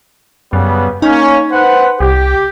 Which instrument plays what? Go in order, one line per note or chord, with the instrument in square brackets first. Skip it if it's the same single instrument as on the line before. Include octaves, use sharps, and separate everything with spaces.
[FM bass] F#2 [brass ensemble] C#3 G3 B3
[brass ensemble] A#3 C#4 [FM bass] D#4
[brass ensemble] B4 C5 F#5
[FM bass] C2 [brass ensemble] G4